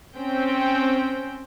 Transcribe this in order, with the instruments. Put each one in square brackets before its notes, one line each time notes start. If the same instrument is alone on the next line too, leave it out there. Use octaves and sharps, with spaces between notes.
[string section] C4 C#4 G5